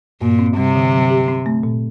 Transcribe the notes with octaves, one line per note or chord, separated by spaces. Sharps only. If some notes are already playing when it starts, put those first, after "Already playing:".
G2 A#2
C4
C3 G3
D3
F#3
G4
C4
A3
A#2